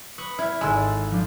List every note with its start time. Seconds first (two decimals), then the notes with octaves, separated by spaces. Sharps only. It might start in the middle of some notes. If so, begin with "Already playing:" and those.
0.18 B4 C#6 D#6
0.38 E4 F6 G#6
0.61 G#1 G#3 A4 E6
1.11 F3 D4